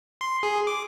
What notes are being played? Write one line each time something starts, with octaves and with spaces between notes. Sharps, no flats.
C6
G#4
D6